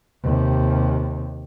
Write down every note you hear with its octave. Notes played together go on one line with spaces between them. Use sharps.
D#2 C3